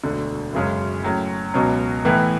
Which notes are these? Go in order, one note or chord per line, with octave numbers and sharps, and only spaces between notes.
E1 D2 D3
F#1 F#2 C#3 G#3 C#4
A2 F#3 C#4
C#2 B2 F#3 C#4
A2 E3 B3